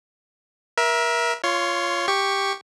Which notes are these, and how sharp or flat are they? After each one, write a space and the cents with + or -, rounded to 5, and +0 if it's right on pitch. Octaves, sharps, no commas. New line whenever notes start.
A#4 +30 E5 +0
F4 -10 C#5 +10 C6 +15
G4 +5 C#6 +0